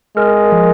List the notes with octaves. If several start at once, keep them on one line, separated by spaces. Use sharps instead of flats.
G#3 A#4
F3